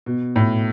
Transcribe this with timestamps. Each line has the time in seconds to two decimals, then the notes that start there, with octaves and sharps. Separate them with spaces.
0.06 B2
0.36 A2